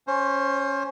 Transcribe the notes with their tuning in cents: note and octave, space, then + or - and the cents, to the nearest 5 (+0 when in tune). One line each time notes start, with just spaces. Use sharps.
C#4 +0 C5 +20